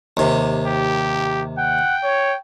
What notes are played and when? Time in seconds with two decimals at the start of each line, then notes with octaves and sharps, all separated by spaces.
0.17 D#2 C3
0.66 G4
1.58 F#5 G5
2.04 C#5